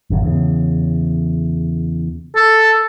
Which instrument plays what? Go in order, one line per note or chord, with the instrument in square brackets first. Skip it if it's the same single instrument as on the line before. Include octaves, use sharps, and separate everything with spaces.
[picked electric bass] G#1 F#2 C#3
E2 C#3
[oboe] A4